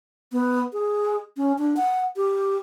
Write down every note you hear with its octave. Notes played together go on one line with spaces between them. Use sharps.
B3
G#4
C#4
D4
F#5
G4